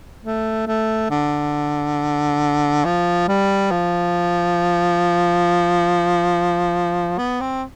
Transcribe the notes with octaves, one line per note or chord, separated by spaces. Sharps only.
A3
A3
D3
F3
G3
F3
B3
C4